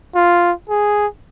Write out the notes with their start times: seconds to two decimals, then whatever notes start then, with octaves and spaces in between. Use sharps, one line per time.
0.15 F4
0.69 G#4